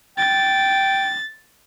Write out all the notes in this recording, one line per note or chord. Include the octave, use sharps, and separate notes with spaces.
G5 A6